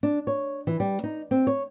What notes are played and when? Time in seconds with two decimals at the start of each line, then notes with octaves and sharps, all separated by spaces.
0.03 D4
0.27 C#5
0.67 E3
0.80 G3
1.03 D#4
1.31 C4
1.47 C#5